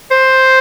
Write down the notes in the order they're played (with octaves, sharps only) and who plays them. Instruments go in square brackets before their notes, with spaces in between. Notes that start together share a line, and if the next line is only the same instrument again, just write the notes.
[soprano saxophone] C5